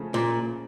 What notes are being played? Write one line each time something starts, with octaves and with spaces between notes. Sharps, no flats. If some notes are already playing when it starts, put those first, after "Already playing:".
Already playing: C#3 F3 A3
A#2